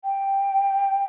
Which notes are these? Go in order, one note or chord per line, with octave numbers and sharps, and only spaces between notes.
G5